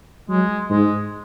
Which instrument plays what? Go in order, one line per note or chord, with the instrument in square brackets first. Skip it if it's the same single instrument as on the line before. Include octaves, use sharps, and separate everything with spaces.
[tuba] F#3 [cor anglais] G#3
[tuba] G#2 [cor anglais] G#3